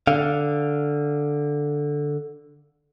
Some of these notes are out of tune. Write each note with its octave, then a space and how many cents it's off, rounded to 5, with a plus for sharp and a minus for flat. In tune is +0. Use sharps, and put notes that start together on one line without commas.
D3 +0 F5 +0